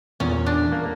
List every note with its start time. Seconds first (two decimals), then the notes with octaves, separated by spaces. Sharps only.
0.20 E2 A#2 C#4
0.46 D4
0.72 A#3